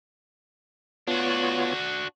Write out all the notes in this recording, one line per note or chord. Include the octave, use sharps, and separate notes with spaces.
B3 D4 F4 F#4 C#5